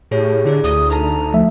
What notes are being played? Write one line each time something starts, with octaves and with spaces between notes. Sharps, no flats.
A2 G4 G#4 C#5
D3 E4 G#4 D5
D2 D#6
D#4 A4 A5 A#5
F3 A3 E5